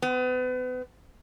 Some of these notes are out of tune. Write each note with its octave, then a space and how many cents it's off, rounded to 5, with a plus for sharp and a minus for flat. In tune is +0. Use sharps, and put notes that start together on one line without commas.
B3 +35